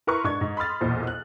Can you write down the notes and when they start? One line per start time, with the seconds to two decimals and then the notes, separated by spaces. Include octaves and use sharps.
0.07 E4 A#4 B4 C6 C#6
0.24 G#2 D4 C#6 G#6
0.41 G#2
0.57 B5 C6 D#6 F6 A6
0.81 B1 E2 A#2 C5
1.07 F#6